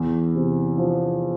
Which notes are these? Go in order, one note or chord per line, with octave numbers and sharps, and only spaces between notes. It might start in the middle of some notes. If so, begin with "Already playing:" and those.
Already playing: E2
C3
F3